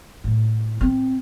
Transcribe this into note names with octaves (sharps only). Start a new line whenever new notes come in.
A2
C4